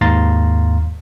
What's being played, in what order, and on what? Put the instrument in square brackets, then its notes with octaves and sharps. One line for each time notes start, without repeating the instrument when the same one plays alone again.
[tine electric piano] D#2 G#2 F5 A#5 C6 A6